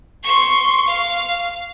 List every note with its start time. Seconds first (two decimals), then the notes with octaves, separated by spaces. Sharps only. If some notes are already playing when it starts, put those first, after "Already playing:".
0.24 C6 C#6
0.88 F5